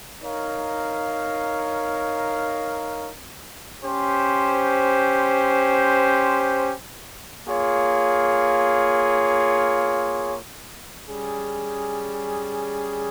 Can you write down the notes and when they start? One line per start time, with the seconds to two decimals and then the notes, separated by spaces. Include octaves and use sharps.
0.22 D#4 A#4 C#5 F5
3.84 C#4 G4 C5
7.46 A#3 F4 G#4 C#5
11.08 G3 C#4 G#4